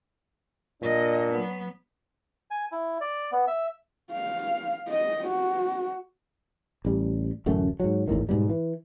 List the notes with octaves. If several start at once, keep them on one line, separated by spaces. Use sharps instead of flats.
A#2 D4 D#5
F#3 B3
G#5
E4
D5
B3
E5
F5
D#5
F#4
A1 G3
D1 A1 F#2 A3
G#2 F#3
G#1 E2 A2 D#3
G#2 B2 G3
E3